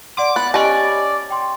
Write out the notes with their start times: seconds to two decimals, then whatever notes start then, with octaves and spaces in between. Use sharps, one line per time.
0.17 D5 F#5 C6 D6
0.36 B3 F#6 A6
0.54 C#4 G4 D5 D#5 G#5 A5
1.31 G5 C6